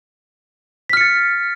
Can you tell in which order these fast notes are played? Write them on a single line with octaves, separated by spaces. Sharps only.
B6 F6 C#7 A6